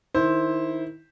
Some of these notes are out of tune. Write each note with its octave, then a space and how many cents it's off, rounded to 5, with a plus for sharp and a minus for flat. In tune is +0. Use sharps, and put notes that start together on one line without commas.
D#3 +0 E4 -15 C5 +5